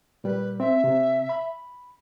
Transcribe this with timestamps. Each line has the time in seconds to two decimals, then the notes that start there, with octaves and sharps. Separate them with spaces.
0.24 A#2 G3 B4
0.60 C4 E5
0.84 C3
1.29 B5